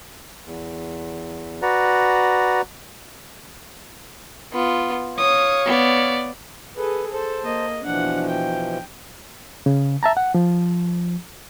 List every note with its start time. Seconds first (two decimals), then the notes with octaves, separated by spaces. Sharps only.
0.45 E2
1.62 F#4 B4 D5 F#5 A#5
4.53 B3 F4
5.18 C#5 F5 D#6
5.66 B3 D5
6.77 G#4 A4 B4
7.12 A4 C5 A5
7.43 A#3 D#5
7.84 B2 E3 F3 D4 F#5
8.29 G5
9.66 C#3
10.03 E5 A5 A#5
10.17 F#5
10.34 F3